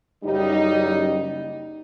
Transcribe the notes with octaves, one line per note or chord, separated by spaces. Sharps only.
F#1 G3 D#4